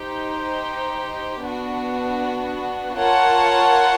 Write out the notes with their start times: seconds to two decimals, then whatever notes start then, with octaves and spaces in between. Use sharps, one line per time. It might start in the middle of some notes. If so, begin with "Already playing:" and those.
Already playing: D#4 G4 C5
1.43 B3 D4 F#4
2.98 F4 A#4 C#5 F#5 A5